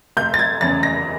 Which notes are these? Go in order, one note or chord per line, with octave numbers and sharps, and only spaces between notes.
F1 G6
A6
G#6
E2 C#3 E3 A6
A#6